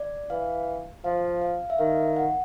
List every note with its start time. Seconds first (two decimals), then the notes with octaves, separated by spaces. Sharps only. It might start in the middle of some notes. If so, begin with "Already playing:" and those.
Already playing: D5
0.30 E3 F5
1.04 F3 F5
1.41 F5
1.70 E5
1.78 D#3 F5
2.16 F#5